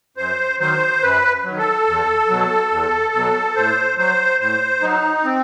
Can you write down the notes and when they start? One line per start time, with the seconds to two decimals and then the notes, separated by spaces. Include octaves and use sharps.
0.17 F#2 C5
0.60 D#3 F#3 C5
1.03 F#2 B4
1.44 D#3 F#3
1.58 A4
1.87 E2
2.29 B2 F#3
2.71 E2
3.14 B2 F#3
3.56 A2 C5
3.98 F#3 C5
4.41 A2 C5
4.82 F#3 D#4
5.24 C4